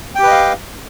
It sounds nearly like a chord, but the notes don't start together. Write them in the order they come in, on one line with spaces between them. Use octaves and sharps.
G5 G4 B4 D#5 F5